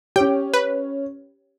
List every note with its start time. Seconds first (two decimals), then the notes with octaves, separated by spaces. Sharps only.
0.16 C#4 G4 C#5 G5
0.54 B4